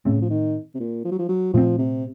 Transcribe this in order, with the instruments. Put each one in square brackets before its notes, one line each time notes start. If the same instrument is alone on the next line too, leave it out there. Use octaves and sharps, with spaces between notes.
[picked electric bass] A2 A3 C4 [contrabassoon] C#3
[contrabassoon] F3
D#3
C3
A#2
F3
F#3
F3
F#3
[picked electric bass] A#2 A3 C4 [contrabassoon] F3
[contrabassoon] C3